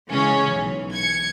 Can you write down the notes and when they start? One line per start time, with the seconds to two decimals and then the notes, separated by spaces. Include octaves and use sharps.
0.10 C#3 E3 G#3 C#4
0.50 B1 E3
0.92 G#6 C#7